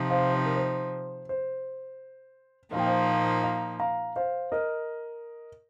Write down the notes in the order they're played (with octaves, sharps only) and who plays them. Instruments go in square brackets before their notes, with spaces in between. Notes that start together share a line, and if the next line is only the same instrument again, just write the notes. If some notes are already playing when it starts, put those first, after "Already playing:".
Already playing: [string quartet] C3 F3 D#4
[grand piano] C5 F5
C5
A#4
C5
C5
[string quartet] A#2 F3 A#3 D#4 [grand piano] F5
[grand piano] G5
C5 F5
F5 A#5
F5 A#5
C5 F5
A#4 D#5